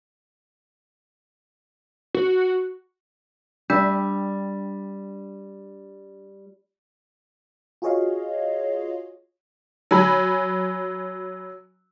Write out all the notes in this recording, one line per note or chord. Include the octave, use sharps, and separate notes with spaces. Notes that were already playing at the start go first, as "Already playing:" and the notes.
F#4
G3 D4
F4 F#4 G#4 C#5 D#5 F5
F#3 G#5 B5